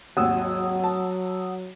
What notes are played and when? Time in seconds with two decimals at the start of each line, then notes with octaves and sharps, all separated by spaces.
0.17 G#1 D#2 F#3 F#5 D#6 E6
0.84 A5